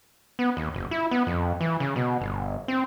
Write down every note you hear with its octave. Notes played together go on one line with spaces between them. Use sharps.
B3
D#2
F#1
E4
B3
F2
E3
C#3
B2
G1
C4